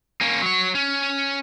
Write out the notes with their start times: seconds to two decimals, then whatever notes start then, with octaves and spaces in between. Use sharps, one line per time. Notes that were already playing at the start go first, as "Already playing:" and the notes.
0.21 A#3 C#4
0.42 F#3 C#5
0.75 C#4